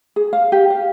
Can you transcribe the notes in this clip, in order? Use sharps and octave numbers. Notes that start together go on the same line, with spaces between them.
G#4
F5
G4
F5